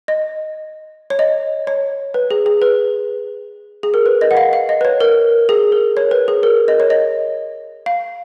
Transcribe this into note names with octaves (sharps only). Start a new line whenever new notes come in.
D#5
C#5
D#5
C#5
B4
G#4
G#4
B4
G#4
A#4
B4
D#5
F#5
F5
F5
D#5
B4
C#5
A#4
G#4
A#4
C#5
B4
G#4
A#4
D#5
C#5
D#5
F5